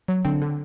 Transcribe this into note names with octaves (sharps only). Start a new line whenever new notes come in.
F#3
D3 C4
D3